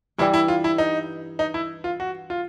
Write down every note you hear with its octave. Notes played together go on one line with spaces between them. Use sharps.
G2 E3 G3 E4
E4
F4
E4
D#4
D#4
E4
F4
F#4
F4